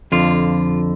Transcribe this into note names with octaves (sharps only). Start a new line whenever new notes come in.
F2 D3 F4